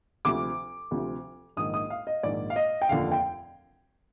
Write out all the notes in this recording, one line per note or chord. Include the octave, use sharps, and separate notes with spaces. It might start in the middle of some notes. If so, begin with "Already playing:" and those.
D2 C3 F3 D6
D2 C3 F3
A#1 G#2 D#3 D#6
D#6
F5
D#5
A#1 G#2 D#3 D5
F5
D#5
G5
F1 D#2 D3 F3 F5
G5